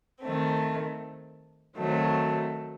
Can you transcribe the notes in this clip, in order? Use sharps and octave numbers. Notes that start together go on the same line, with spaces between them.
D#3 A3 C4
D#3 F#3 A3 C4